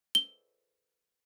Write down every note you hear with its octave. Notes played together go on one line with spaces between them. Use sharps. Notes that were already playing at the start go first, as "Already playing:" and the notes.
G7